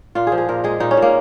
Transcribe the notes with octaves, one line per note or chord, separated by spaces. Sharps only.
A#2 F4
G#4
F3
G#4
A#2 A#4
G#3 G#4
A#2 D#4
C#4
A#2
A#3